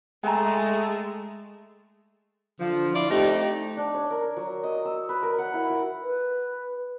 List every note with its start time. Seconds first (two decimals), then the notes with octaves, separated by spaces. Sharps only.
0.24 G#3 A3 G5 G#5 A#5
2.60 D3 F3
2.95 E4 F4 D5
3.11 A3 C4 D#4 G4
3.77 D4
3.95 C#5
4.10 A#4
4.37 F#3
4.64 D#5
4.85 E6
5.09 B4
5.23 A#4
5.38 F#5
5.54 E4
5.70 F#4
6.03 B4